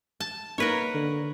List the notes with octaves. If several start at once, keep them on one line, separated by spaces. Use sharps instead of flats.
A5
A#3 D#4 A#4 B4 C#5
D3